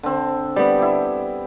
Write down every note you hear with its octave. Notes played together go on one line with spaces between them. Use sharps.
D3 C4
G3 B3
E4 G4